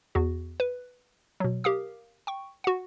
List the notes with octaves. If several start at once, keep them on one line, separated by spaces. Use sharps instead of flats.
E2 F#4
B4
B2 F#3
G4 A#4 F5 D#6
G5 C#6
F#4 F#5